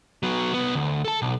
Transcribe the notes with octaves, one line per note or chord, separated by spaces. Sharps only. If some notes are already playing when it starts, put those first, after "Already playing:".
F#3 B3
C2 B3
D2
A4 A5
B1